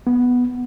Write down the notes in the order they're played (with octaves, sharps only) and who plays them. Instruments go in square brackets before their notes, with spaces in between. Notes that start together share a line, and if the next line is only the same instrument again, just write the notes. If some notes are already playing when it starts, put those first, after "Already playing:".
[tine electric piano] B3